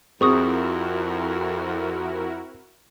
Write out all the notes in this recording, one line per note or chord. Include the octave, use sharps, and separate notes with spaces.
F2 C4 E4 F#4 G#4 A#4 C#6 D#6